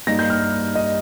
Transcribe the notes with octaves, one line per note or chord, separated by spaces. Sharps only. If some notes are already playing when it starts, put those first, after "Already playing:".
G2 G3 A#3 D#4 A#6
G6
F6
D#5